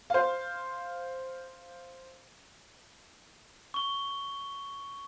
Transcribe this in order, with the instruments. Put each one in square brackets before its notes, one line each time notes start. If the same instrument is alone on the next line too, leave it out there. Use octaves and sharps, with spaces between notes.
[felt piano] C5 F5
[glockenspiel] C#6 G7